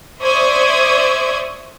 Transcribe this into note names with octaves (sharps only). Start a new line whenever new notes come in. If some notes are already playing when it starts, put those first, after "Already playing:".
C5 D5 E5 C#6 D#6 G#6